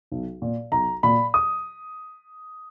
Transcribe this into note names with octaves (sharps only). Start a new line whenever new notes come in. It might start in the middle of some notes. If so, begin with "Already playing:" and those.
B1
A#2
B1 A#5
A#2 B5
D#6